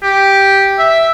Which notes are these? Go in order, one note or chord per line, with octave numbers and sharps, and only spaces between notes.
G4
E5